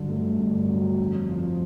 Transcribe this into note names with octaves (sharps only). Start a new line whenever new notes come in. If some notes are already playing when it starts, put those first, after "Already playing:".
Already playing: G2 D3 F#3
A3
G2
F#3
F2
F3